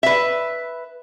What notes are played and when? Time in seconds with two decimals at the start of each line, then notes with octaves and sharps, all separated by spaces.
0.03 B4 E5